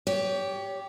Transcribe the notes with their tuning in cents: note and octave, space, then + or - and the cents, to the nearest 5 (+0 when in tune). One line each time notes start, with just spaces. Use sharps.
G4 +0 C#5 +35